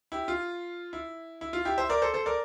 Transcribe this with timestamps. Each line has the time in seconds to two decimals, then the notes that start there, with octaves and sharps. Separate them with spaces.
0.12 E4 G4
0.28 F4
0.93 E4
1.41 E4
1.53 F4
1.65 E4 G4
1.78 C5 E5
1.89 A#4 D5
2.02 A4 C5
2.14 A4 C5
2.26 A#4 D5